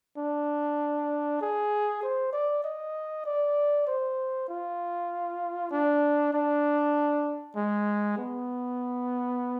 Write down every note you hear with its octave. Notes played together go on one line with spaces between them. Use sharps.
D4
G#4
C5
D5
D#5
D5
C5
F4
D4
D4
G#3
B3